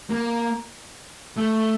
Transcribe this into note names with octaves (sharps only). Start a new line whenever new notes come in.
A#3
A3